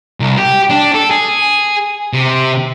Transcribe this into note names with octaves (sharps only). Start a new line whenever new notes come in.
C2
G4
D4
A4
G#4
C3